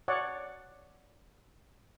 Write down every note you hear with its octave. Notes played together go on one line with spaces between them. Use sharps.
C#5 D5 F#5